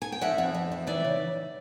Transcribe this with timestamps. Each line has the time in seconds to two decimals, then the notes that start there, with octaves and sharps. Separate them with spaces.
0.02 G#5
0.12 G5
0.21 F2 E5 F#5
0.38 F2
0.54 F2
0.72 F2
0.87 E3 D5 E5
1.04 C#3